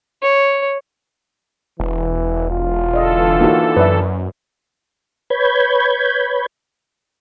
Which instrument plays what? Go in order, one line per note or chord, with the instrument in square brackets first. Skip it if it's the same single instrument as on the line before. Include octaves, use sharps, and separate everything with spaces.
[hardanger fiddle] C#5
[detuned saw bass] E1 [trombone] E3
[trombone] F4
[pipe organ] D3 E3 A4 [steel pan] D5 D#5
[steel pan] A#3 D#4 F#4
[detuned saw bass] F#2 [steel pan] B4 D5 E5
[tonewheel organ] B4 C#5 B5 G6 G#6